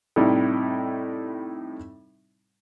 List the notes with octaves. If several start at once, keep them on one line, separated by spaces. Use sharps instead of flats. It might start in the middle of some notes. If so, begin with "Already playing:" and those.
A2 C3 G3 D#4 E4